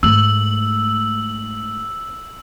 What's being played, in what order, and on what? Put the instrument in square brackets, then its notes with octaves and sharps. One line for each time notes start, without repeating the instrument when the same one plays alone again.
[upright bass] G#2 A3 [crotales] E6 F#7